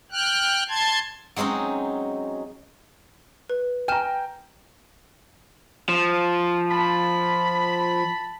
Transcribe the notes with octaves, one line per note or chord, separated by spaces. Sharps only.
G5 F6 F#6
A5 C6 G#6
F#3 G#3 C4 C#4 D#4
B4
G5 G#5 A#5 F6 E7
F3
A5 B5